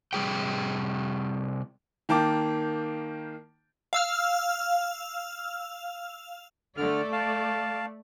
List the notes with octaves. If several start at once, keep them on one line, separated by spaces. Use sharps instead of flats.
C3 G3 G#4 G5
D#3 A#3 G5 A5 D6
F5 E6 F6
D3 A3 D5 F6
F5 A5